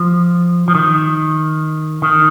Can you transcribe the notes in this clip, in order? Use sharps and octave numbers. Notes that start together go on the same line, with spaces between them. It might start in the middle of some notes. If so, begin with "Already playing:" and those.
Already playing: F3
F3
D#3
D#3